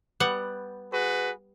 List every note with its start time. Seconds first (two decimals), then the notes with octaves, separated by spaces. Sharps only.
0.20 G3 B3 F#5
0.92 F#4 G#4 B4